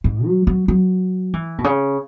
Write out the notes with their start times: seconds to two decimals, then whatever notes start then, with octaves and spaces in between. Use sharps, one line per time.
0.04 G#2
0.26 F#3
0.47 F#3
0.68 F#3
1.34 E3
1.58 B2
1.64 C#3